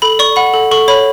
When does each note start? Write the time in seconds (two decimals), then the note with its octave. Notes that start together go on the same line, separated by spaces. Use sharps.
0.02 A4 B5
0.19 D5 C#6
0.36 F#5 B5
0.54 A4
0.71 A4 C#6
0.88 C#5 B5